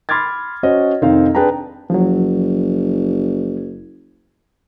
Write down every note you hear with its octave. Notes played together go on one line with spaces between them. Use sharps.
B5 C6 D6 F6 G#6 A6
C#4 F#4 C5 C#5 D#5
F1 D#3 C4 D#4 F5
D4 G#4 B4 G5 A5 A#5
F#1 F3 F#3